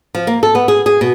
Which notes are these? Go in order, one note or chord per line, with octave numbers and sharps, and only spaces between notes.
F3
A#3
A4
B3
G#4
G#4
B2